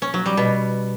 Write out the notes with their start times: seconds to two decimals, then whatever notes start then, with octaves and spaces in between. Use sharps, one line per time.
0.02 C#4
0.14 F#3
0.26 G3
0.37 B2